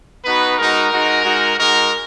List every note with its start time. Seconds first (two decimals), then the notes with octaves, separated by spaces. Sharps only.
0.24 B3 D#4 F#4 B4
0.58 G#3 D#4 F#4 A#4
0.91 G#3 D#4 F#4
1.24 G#3 D#4 F#4
1.58 G#3 D#4 F#4 A#4